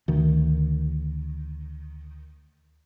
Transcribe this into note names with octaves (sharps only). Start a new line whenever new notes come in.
D2 D#3